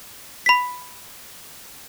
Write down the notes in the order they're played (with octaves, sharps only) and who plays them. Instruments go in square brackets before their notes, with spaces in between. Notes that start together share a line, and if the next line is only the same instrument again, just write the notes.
[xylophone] B5 B6